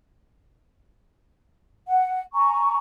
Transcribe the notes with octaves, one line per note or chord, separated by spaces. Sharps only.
F#5
G#5 A#5 C#6